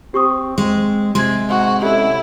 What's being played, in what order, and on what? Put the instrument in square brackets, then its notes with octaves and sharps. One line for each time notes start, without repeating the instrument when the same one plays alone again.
[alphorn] C4 [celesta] G4 C#6 D#6
[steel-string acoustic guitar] G#3 [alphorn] C4
[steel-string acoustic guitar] C3 G#3 [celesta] C6 G#6
[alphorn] G#2 [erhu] F#4
[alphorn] C#4 [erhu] E4 [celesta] G4 A4